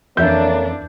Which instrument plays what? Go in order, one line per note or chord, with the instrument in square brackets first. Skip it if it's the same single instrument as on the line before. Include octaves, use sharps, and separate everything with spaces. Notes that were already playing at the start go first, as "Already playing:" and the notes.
[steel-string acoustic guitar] F2 [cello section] E3 D4 [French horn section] A#3 A4 C#5 [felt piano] E5 G6